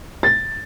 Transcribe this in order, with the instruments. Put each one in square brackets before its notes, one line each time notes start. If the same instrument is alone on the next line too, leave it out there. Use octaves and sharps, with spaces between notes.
[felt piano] A6